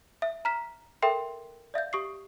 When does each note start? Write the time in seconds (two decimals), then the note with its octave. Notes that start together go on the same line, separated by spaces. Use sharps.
0.22 E5
0.45 A#5 F6 B6 E7
1.02 A4 A#4 E5 G5 C6
1.74 D5 E5 F5 G6
1.93 G4 C#6 D#6 C7